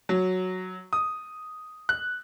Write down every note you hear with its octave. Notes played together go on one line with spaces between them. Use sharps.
F#3
D#6
F#6